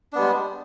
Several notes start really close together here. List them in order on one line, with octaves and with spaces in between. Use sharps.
D4 B3 G3 G#3